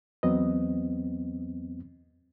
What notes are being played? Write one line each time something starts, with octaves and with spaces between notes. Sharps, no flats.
E2 F#3 B3 C4 D#5